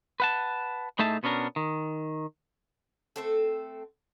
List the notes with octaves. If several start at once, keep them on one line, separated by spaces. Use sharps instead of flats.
B4 F#5 A5
A2 A3 D#4 G#4 E5 A5
B2 B3 C#4 D4 A#4
D#3
A3 C4 A4